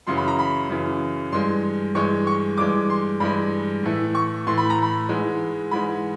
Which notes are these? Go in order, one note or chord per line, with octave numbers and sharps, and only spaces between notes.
F#2 C#3 E3 C6
B5
A#5
B5
F#2 C#3 E3
G2 E3 G#3 C6
G2 E3 G#3 C#6
C#6
G2 E3 G#3 D6
C6
G2 E3 G#3 B5
A2 E3 A3
C#6
A2 E3 A3 C6
B5
A#5
B5
G#2 E3 G#3
G#2 E3 G#3 B5